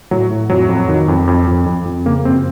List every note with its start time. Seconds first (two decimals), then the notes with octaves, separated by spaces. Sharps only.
0.11 A2 F#3
0.31 A2
0.50 F2 F#3
0.69 F2
0.89 D#3
1.08 F2
1.27 F2
1.47 F2
1.66 F2
1.85 F2
2.05 C#3 A#3
2.25 F#2 C4